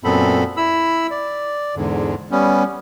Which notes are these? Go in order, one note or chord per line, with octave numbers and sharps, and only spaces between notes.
F#2 A#2 B3 C4 A4 B5
E4 B5 E6
D5
E2 G#2 D3
G3 B3 C#4